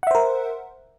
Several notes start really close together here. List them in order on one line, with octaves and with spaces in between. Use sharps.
F#5 E5 C5 A#4